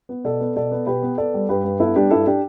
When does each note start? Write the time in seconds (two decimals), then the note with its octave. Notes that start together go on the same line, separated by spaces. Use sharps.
0.09 B3
0.24 B2 A4 D5
0.40 B3
0.56 B2 A4 D5
0.72 B3
0.86 B2 G4 B4
1.03 B3
1.18 B3 A4 D5
1.34 G3
1.49 G2 G4 B4
1.64 G2
1.79 B3 E4 A4
1.95 G3 D4 G4
2.11 G2 E4 A4
2.26 D4 G4